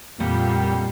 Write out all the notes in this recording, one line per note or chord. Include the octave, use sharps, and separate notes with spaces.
F2 A#2 G3 F#5